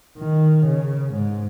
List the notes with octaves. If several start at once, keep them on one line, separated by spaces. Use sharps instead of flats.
D#3
C#3
G#2